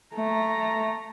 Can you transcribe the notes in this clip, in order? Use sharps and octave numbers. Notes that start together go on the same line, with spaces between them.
A3 A#5